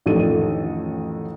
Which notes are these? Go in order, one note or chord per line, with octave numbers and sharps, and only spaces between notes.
A1 F2 D#3 D4 A4 D#7